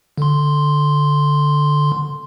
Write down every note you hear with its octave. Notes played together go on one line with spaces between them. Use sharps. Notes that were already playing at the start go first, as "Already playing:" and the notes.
D3 C6